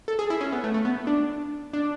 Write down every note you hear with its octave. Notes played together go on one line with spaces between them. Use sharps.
A4
G#4
E4
C#4
B3
A3
A3
B3
D4
D4